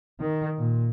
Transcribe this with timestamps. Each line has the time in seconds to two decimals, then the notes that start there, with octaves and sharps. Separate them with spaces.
0.20 D#3
0.58 A#2